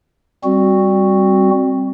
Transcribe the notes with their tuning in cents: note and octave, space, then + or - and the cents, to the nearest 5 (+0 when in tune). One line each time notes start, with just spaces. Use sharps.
G3 +0 C4 +10 F#4 +0